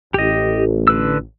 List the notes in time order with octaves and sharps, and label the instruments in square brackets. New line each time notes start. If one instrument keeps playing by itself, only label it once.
[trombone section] A1 [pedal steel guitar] G4 D#5
[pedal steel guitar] D3 B4 E6